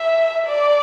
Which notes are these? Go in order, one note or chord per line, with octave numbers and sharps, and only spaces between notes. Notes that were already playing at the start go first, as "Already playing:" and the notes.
Already playing: E5
D5